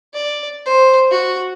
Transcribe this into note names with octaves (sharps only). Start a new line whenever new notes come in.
D5
C5
F#4